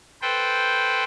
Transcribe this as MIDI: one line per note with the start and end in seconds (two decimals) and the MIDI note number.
0.22 1.04 69
0.22 1.04 71
0.22 1.04 72
0.22 1.04 79